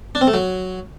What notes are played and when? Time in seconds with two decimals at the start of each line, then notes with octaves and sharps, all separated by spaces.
0.15 D4
0.21 C4
0.27 A3
0.34 F#3